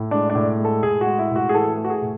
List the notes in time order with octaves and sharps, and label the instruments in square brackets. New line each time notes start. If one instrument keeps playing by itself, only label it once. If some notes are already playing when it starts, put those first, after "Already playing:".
Already playing: [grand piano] A2
G#3 D4
D4
A2
G#3
A4
A2 G#4
F#4
G#3
E4
A2 F#4
G#4
E3 A4
A3
F#4
G#4
A2